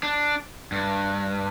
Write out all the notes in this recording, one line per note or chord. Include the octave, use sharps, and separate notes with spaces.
D4
G2